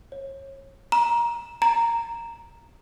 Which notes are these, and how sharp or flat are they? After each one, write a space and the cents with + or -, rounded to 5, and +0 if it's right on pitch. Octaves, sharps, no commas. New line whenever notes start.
C#5 -30
A#5 +20
A#5 -5